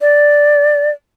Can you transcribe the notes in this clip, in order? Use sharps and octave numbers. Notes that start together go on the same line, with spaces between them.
D5